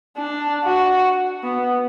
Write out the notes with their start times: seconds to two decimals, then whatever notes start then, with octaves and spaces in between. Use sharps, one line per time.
0.17 D4
0.64 F#4
1.43 B3